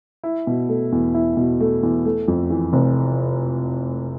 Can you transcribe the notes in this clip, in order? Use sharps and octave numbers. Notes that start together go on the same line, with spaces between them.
E4
B2
A3
E2
E4
B2
A3
E2
A3
F2
E3
F1